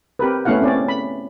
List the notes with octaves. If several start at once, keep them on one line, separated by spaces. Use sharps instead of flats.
C4 G4 A#4 B4
A3 B3 C#4 E4 F5 F#5
C4 C#4 D5
B5